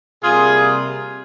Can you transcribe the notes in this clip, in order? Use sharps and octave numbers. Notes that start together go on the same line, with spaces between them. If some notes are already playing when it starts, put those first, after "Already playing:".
C3 G3 A#3 F4 G#4